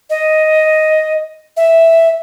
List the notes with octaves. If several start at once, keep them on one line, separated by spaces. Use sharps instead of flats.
D#5
E5